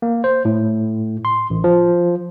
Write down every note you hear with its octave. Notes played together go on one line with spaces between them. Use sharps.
A#3
C5
A2
C6
A1
F3